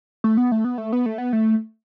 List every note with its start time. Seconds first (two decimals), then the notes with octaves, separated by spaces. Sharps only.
0.24 A3
0.37 B3
0.52 A3
0.64 B3
0.78 A3
0.92 B3
1.06 A3
1.18 B3
1.33 A3